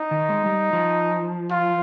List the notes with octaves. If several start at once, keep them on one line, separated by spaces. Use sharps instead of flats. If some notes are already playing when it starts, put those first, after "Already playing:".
Already playing: D#4
D#3
G#3
G3
F3
F4